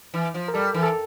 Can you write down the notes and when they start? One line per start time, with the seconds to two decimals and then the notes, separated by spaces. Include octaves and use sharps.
0.14 E3
0.34 F3
0.48 A#4
0.54 G3 A4
0.74 E3
0.83 A4